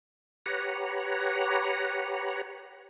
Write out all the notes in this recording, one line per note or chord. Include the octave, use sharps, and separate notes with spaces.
G4 B4 C#5 F#5 A#5